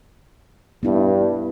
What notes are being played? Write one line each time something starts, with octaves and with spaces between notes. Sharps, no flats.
G2 B3 E4